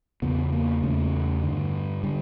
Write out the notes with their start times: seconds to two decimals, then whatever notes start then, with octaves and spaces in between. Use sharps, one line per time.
0.22 E2 C#3 B3
0.53 A#3
0.83 E2 C#3 A3
1.43 G2 D3
2.04 D3 G3